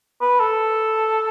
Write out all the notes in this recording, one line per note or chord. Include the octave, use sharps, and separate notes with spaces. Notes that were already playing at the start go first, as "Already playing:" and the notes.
B4
A4